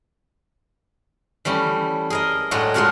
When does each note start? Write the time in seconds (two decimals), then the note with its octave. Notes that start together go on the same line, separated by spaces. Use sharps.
1.45 E3 G3 A3 C#4
2.10 G#4 A#4 D#5
2.51 A2 F#3 G#3 D4 F#4 D#5
2.74 G#3 A3 F4 F#4 A#4 F#5